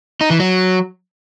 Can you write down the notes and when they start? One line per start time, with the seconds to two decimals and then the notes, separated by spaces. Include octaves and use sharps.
0.21 D#4
0.30 E3
0.40 F#3